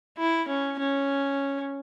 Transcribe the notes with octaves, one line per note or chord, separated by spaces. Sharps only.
E4
C#4
C#4